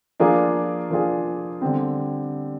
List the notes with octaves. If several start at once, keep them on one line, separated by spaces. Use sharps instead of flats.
F3 A#3 D4 F4 G#4
F3 A#3 D4 F4 G#4
D3 G3 C4